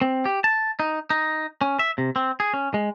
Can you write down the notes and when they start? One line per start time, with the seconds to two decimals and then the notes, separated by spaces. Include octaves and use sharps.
0.01 C4
0.25 G4
0.44 A5
0.80 D#4
1.10 D#4
1.61 C#4
1.79 E5
1.98 C3
2.16 C4
2.40 G#4
2.54 C#4
2.74 G#3